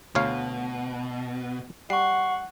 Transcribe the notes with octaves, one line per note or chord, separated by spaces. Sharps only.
D2 B2 C#5 F5
G3 F#5 C#6 C7